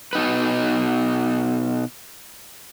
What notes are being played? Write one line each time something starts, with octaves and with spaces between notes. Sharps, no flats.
B2 D#4 B4